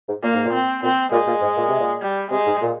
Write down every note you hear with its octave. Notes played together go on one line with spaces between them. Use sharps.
G#2
A#2 A#3
G#2
A#2
C4
A#2 C4
A#2 G#3
A#2
G#2
A#2
C3
A#2
G3
C3 G#3
G#2
A#2